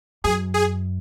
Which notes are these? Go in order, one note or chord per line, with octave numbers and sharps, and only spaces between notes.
F#2 G#4
G#4